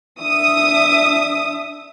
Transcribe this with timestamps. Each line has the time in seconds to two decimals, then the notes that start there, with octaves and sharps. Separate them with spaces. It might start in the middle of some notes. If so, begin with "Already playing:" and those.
0.22 D4 E5 D#6